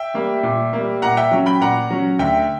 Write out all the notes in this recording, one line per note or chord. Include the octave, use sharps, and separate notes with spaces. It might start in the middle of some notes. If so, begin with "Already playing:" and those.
Already playing: E5 G5
G3 A#3
A#2
G3 A#3
A#2 F#5 A#5
E5 G5
F#3 C#4
G5 B5
A#2 F#5 A#5
F#3 C#4
D2 E5 G5